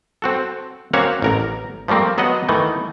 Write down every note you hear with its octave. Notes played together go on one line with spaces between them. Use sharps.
C4 F#4 A4
A#3 C4 C#4 F#4 C#5
A1 A#4 A#5
F3 G3 A3 A#3 C4
F#3 B3 F#4 B4 D#5 F#5
D#3 E3 A3 D#4